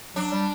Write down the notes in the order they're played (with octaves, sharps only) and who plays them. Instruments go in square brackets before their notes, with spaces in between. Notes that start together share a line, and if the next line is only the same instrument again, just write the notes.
[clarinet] F#3 [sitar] D4
[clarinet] G3